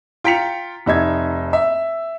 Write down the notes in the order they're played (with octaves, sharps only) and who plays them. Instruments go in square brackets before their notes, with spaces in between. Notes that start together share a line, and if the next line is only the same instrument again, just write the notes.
[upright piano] F4 G5 A#5 B6 C#7 F7
F1 D#4 E5 G#6
E5